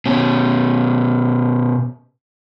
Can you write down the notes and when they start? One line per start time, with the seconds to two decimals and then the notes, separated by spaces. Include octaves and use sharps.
0.06 B2 C#4